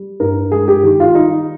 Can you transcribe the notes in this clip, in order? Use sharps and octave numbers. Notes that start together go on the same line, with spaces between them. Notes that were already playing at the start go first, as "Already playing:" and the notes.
Already playing: G3
G2 A#4
G#3 G#4
G4
D#3 G4
F4
G3 D#4